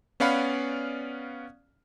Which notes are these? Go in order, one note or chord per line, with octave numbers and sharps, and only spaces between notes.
B3 C#4 D5 F5 F#5 B5